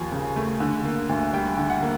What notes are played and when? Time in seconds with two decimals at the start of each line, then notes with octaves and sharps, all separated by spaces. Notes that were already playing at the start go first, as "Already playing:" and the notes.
Already playing: D#2 F3 G#5
0.12 C#3
0.36 A3
0.60 D3
0.84 A#3
1.09 D2
1.33 G3 G5
1.57 D3
1.70 F#5
1.82 A#3